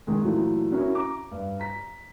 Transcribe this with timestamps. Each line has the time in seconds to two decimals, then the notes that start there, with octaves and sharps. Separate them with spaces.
0.07 D#3 G#3
0.21 A#2 E3 F#3 A3
0.72 C#4 E4 F#4 A#4
0.95 A#5 D6
1.31 G2
1.60 A#5 B6